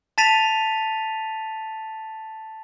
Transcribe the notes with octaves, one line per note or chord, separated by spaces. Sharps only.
A5 A6 B6 D#7 F7